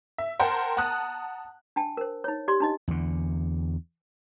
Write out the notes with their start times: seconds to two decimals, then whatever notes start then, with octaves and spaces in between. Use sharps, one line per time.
0.18 E5
0.39 A#4 C5 F#5 G5 A5 A#5
0.77 F#5 A5 A#5 D#6 F#6
1.76 D4 G5 A5
1.97 A#4 C5
2.24 D#4 C#5
2.48 G4 D5 C6
2.60 D4 D#4 D#5
2.88 E2 D3